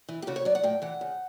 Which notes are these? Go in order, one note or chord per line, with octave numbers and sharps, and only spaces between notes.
E3
G4
C#3 F#4
C#5
F#3 D5
F#5
A2 G5
E3 F#5
C#3